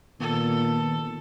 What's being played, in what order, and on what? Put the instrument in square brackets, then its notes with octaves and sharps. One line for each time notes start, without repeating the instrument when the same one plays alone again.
[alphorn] A#2 [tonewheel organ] D#3 B3 [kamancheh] A4